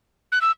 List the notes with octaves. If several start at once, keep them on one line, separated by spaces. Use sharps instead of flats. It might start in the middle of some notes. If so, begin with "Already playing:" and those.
F#6
E6